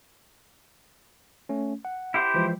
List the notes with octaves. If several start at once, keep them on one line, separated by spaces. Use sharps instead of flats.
A3 C#4
F#5
E4 G4 C5
E3 F3 G#3